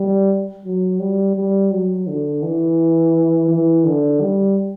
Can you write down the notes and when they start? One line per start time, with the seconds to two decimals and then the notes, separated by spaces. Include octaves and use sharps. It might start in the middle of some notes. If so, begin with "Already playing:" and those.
Already playing: G3
0.65 F#3
1.00 G3
1.35 G3
1.71 F#3
2.08 D3
2.43 E3
3.49 E3
3.85 D3
4.21 G3